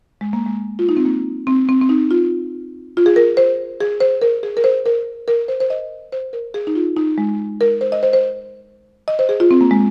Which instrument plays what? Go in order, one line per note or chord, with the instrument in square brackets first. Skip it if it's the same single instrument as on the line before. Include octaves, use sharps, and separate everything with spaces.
[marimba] G#3
A#3
G#3
F4
D#4
C4
A#3
C4
C4
C4
D#4
F4
F4
G#4
A#4
C5
G#4
C5
A#4
G#4
A#4
C5
A#4
A#4
C5
C5
D#5
C5
A#4
G#4
D#4
F4
D#4
G#3
A#4
C5
D#5
C5
C5
D#5
C5
G#4
F4
C4
A#3
G#3